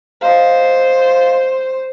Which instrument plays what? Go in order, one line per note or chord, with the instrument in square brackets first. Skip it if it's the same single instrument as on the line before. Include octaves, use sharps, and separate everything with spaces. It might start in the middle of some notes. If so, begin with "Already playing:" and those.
[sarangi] C5 [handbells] D#5 F5